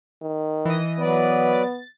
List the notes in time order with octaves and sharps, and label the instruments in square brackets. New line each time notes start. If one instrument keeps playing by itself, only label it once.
[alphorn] D#3
[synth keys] E3 D#5
[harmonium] F#3 B4 D5 [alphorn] B3
[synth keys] A6